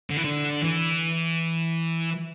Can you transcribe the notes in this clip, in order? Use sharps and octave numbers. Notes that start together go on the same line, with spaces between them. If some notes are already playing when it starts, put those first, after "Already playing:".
D3
E3
D3
E3